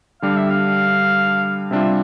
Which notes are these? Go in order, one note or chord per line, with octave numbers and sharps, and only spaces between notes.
D3 G3 D4 G4 F5
E5
F5
C3 G3 D4 F4 E5